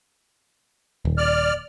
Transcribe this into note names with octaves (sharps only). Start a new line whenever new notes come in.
D#1
D5 F6